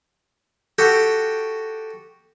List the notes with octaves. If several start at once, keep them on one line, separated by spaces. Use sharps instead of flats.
F#4 G4 A4 G5